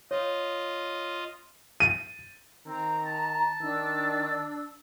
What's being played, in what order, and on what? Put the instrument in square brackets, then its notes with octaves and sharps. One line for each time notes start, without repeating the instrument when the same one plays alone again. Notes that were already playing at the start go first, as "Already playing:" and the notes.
[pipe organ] F4 D#5 [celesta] C#5
[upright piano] D#7
[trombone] D#3 [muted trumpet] C4 [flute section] A#5
[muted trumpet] A5
[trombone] D#3 [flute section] D4 E6